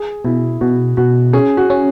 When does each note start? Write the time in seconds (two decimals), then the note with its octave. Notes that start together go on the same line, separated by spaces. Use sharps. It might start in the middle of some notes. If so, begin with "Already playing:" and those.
Already playing: G#4
0.25 B2 E4
0.61 B2 F#4
0.97 B2 F#4
1.33 C#4 G#4
1.57 F#4
1.70 C#4